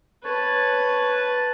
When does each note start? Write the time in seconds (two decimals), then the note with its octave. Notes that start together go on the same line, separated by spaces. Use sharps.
0.24 B4 C#5 A5
1.17 A5